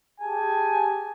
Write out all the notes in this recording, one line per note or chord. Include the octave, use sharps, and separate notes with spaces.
G4 G#4 G#5 A5